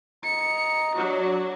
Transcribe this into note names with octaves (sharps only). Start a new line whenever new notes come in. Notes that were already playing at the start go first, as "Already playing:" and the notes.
D#5 A#5 C#7
F#3 D4 F#4 D5